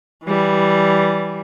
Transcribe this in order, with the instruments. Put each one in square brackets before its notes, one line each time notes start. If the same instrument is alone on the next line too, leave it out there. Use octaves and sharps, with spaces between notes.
[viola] E3 G3